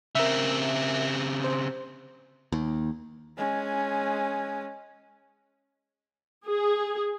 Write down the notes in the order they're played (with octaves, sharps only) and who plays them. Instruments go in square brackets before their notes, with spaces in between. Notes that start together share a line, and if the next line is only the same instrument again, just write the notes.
[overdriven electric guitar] C#3 C4 [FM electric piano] A#4 E5
[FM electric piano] C5
[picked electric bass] D#2
[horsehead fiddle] G#3 C#4
[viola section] G#4